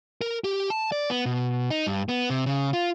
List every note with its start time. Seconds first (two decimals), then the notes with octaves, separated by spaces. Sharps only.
0.21 A#4
0.44 G4
0.70 A5
0.92 D5
1.10 B3
1.26 B2
1.71 D#4
1.87 G2
2.09 B3
2.30 C3
2.46 C#3
2.73 F4